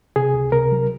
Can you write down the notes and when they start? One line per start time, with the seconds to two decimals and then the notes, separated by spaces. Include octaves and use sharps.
0.16 C3 G#4
0.34 C#2
0.52 C3 A#4
0.72 F#3